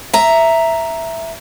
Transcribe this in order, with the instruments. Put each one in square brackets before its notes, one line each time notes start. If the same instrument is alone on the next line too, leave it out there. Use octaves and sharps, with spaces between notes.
[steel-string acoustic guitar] E5 A#5